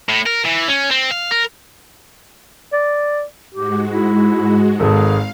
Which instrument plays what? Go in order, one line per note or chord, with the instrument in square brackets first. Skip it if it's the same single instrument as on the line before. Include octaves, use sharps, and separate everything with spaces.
[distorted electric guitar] A2
A#4
E3
C#4
C4
F5
A#4
[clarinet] D5
[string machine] G#2 G#3 F#4 [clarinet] G4
[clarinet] E4
[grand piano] G#1 A4 [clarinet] G#4 [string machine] F5